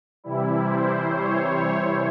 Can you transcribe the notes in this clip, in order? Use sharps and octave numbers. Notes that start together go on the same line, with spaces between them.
C3 E3 G3 E4
C5
C#5